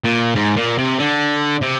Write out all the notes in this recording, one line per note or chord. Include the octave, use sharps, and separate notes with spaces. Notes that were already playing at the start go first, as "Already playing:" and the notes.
A#2
G#2
A#2
C3
D3
C3